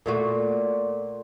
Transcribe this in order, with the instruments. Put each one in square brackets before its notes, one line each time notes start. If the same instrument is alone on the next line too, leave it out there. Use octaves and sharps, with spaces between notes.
[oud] A#2 A3 F#4